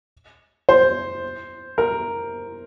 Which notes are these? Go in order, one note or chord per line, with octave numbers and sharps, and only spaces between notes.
C5
A#4